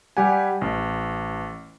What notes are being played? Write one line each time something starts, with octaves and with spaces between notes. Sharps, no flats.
G3 G4 F#5 G#5
A1